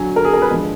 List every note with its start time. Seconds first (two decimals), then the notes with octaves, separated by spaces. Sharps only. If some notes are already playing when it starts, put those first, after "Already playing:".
Already playing: D3 F#3 G#5
0.16 A#4
0.25 G#4
0.33 A#4
0.42 B4
0.50 D3 F3 G#3